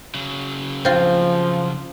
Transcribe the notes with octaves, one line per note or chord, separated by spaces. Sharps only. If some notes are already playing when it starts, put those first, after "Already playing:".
C#3 F#3
F3 C4 F4